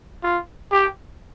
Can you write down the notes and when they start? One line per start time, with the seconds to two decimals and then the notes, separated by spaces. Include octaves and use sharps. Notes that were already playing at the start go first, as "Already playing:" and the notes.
0.23 F4
0.72 G4